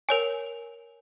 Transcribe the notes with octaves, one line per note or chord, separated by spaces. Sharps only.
A#4 C#5 G#5